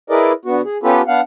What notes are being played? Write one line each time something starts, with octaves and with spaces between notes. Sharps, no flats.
E4 G#4 A#4 B4 D5 D#5
D3 B3 F#4
G#4
B3 C#4 F4 G4 A4 B4
B3 D4 F5 F#5